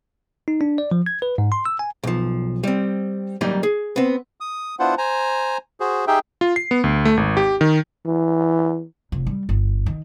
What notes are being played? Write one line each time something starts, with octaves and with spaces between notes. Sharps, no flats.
D#4
D4
D5
F3
G#6
B4
G#2
C6
E6
G#5
B1 F3
G3 C4
F#3 G3 A#3 D#4
G#4
B3 C4
D#6
B3 D4 E4 F4 C5 F#5
C5 G#5 A#5
F#4 G#4 C5
D#4 G4 G#4 E5 G5
F4
C7
B3
D2
A3
G#1
G4
D#3
E3
F1
G3
G1
D#3